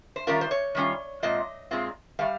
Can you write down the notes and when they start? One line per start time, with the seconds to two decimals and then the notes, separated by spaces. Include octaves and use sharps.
0.16 C5
0.27 D#3 G3 C#4 F4 A#4
0.41 C5
0.51 C#5
0.75 D#3 G3 C#4 F4
1.23 A#2 G#3 C4 F4 D#5
1.71 A#2 G#3 C4 F4
2.19 D#3 G3 F5